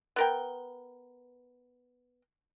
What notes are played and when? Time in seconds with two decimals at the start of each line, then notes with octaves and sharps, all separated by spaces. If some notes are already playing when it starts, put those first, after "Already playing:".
0.16 B3 A#4 G5